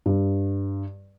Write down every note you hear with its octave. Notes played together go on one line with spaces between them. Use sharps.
G2